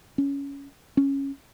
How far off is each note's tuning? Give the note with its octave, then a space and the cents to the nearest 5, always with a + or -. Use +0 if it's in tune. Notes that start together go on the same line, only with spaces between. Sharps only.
C#4 +15
C#4 -5